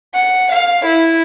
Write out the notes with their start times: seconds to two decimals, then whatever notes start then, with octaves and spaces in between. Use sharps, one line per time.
0.14 F#5
0.51 F5
0.85 E4